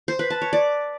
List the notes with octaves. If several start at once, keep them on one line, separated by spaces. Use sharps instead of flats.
C5
B4
A5
C#5
D5